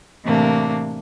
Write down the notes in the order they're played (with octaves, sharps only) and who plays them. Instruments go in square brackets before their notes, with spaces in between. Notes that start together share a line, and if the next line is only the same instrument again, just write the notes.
[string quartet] A2 C3 E3 A3 A#3 D4